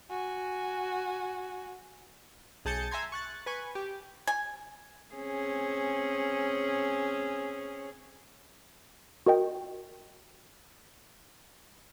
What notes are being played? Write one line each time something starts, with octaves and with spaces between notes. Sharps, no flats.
F#4 G#5
B1 G#4 A5 G6 A6 C#7
E5 G#5 A#5 C6 G#6
C#6 F#6 A6
B4 G#5 C#6
G4
G#5
C4 C#4 G#4
F#4 A#4 D#5 G5